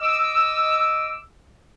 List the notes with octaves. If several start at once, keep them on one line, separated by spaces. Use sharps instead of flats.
D#5 D6 E6